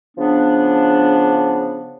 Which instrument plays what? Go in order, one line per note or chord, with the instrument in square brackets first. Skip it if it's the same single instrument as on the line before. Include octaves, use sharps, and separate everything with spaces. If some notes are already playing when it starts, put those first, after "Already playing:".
[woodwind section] C#3 F3 B3 D4